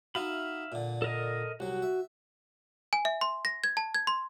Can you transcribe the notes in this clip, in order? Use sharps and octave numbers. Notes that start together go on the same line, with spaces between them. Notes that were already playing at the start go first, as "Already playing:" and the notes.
D#4 F#4 E5 F5 B5
A#2 D3
A4 A#4 D#5
C2 F#3 F#4
E5
G#5
E5
C6
A#6
G#6
A5
G#6
C6